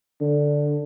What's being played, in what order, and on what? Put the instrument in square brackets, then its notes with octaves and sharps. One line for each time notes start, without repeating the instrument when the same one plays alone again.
[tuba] D3